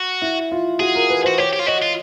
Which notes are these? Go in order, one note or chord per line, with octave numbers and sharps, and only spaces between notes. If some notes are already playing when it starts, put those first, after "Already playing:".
Already playing: F#4
E4
F4
F#4 G#4
A#4
B4
F#4 C5
G4 C#5
G4
F4
F#4 D#5
F4